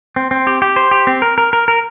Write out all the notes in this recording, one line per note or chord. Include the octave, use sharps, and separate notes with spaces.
C4
C4
G4
G4
C5
G4
C4
A#4
A#4
A#4
A#4